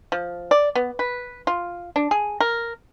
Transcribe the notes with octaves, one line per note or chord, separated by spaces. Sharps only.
F3
D5
B3
B4
F4
D4
G#4
A#4